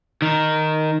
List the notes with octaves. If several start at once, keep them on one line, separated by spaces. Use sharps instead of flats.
D#3